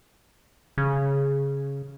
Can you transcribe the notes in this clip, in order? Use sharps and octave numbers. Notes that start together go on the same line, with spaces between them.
C#3